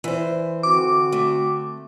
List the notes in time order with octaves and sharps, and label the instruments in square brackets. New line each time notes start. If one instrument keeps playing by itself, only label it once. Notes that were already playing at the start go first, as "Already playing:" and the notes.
[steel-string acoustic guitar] E3 C5
[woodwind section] D3 C4 F#4 [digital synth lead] D6
[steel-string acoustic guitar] A3